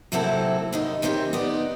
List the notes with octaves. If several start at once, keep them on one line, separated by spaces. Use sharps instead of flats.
C3 F#3 A#3 C4 E4 A4
F#2 D#3 D#4
C3 D#3 C4 C#4 G4
B3 D#4 D5